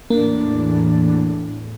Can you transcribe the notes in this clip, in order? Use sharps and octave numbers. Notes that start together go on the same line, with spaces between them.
E2 A2 E3 A#3 D4